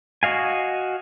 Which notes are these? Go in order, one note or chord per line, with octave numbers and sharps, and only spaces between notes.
F#4 D#5 F5 G#5